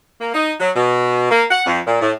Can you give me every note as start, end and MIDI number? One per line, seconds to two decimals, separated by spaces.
0.20 0.32 58
0.34 0.52 63
0.60 0.69 54
0.75 1.27 47
1.31 1.43 58
1.50 1.64 78
1.66 1.80 41
1.87 2.01 46
2.01 2.11 45